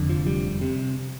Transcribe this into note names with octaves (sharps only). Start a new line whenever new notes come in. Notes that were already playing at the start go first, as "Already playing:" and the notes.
Already playing: F1 F2 D3
F3
G3
C3